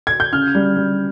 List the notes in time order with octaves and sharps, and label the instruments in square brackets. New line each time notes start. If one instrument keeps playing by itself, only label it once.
[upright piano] G#6
G6
C#3 F6
G3
G3